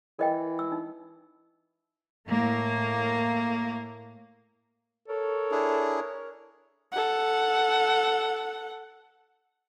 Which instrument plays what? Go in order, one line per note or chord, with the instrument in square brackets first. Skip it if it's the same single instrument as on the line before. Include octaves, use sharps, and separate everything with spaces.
[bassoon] E3 [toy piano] A#4 D#5 G5
[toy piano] E6
D#4
[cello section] A2 A#3
[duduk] A4 [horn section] A#4 C#5
[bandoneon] D4 E4 G#4
[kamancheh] A4 F#5